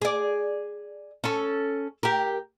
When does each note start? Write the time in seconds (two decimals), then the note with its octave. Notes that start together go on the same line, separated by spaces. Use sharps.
0.02 G#4 D5
1.24 C#4 A4
2.03 G4 A#4